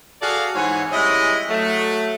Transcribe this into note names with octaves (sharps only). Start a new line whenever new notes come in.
F#4 G#4 A4 D5 F5
G#2 E3 C4 C#5 F#5 G#5
G3 G#3 C#4 E4 D#5
F#3 A3